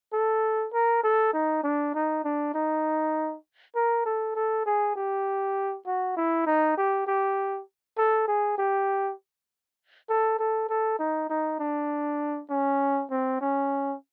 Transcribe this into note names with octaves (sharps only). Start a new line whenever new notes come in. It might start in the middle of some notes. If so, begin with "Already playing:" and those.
A4
A#4
A4
D#4
D4
D#4
D4
D#4
A#4
A4
A4
G#4
G4
F#4
E4
D#4
G4
G4
A4
G#4
G4
A4
A4
A4
D#4
D#4
D4
C#4
C4
C#4